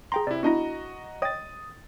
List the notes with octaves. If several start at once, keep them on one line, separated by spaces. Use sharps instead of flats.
G#4 G5 A#5 C6
C3 E4 D5
B3 D4 E4 F#4 D#5 A#5
C#5 D#5 G5 D#6 A6